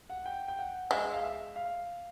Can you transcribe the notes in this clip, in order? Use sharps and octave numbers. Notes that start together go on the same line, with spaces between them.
F#5
G5
G5
F#5
G#3 E5
F5
E5
F5